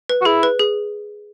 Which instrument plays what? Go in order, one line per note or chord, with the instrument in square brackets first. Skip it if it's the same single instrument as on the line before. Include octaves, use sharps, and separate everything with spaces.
[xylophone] B4
[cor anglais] F#4
[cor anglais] E4 [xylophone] G#4
[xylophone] B4
G#4